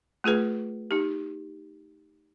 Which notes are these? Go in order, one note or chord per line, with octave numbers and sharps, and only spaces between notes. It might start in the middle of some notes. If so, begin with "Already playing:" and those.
A3 F4 G#4 B4
D#4 G4